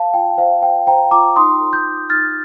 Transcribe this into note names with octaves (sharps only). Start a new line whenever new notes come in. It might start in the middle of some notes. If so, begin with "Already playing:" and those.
Already playing: C5 F5 A5
F4 G5
C5 F5
C5 G5
C5 G5 A#5
F4 A#5 D6
D#4 C6 D#6
A4
D#6 G6
D#4
D#4 F6 A6